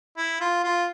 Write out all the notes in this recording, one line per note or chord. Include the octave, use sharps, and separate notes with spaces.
E4
F4
F4